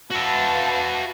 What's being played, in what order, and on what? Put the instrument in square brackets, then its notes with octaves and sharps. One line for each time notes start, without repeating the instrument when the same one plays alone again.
[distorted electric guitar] F#4 E5 [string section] B4 F5 A5